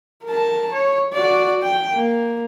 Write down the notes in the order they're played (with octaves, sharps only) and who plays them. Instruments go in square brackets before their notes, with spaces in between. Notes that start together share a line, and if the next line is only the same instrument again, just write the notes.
[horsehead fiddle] A#4 A5
C#5
F#4 D5
G5
A#3